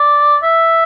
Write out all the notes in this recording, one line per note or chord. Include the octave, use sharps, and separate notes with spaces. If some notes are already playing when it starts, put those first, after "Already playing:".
Already playing: D5
E5